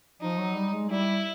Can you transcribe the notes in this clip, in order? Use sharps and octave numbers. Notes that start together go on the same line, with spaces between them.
F3 D#4
F#3
G3
G#3
G3 E4